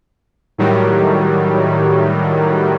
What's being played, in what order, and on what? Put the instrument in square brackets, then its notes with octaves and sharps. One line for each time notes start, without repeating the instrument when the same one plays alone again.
[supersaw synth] A2 D#3 F#3 G3